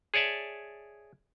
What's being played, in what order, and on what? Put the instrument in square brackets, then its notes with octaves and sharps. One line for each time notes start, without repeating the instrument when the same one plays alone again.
[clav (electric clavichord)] G#4 C#5 D5 E5 A5